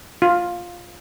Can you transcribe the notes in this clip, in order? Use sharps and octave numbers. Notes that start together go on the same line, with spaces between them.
F4